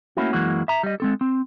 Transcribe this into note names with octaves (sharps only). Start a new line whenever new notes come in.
A3 A#3 C#4 E4 F#4
F#2 E3 G#3 A#3 F#4
E5 A#5
G3 D#5
G#3 C4 A4
C4